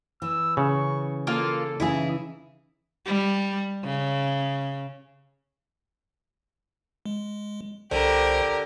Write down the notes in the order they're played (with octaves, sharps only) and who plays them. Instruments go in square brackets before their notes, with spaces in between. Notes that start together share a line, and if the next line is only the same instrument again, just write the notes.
[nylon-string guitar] E3 [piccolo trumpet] E6
[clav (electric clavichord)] C#3 [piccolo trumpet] C#6
[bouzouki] A#3 F4 [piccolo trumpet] A4
[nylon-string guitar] C#3 E3 D#4 [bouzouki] E4 G#4
[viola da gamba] G3
C#3
[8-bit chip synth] G#3
[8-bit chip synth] C2 C5 [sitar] D3 [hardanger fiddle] G4 A#4